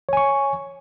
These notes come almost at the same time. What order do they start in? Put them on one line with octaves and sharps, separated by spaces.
C#5 G#5 C#6